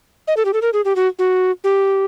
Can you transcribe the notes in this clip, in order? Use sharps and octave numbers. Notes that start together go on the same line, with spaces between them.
D#5
A4
G4
A4
A#4
G#4
G4
F#4
F#4
G4